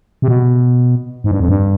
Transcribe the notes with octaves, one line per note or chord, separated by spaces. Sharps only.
C3
B2
G#2
G2
F2
G2